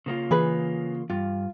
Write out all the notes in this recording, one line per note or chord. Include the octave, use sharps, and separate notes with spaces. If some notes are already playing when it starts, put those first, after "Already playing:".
C#3 A#3 F4
E3 G#4 B4
G2 F4